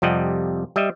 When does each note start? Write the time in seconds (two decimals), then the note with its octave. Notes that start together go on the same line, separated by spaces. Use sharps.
0.02 F2 C3 G3 D#5 F#5
0.76 G3 D#5 E5